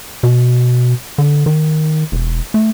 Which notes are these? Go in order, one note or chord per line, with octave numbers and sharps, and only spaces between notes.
B2
D3
D#3
E1
A3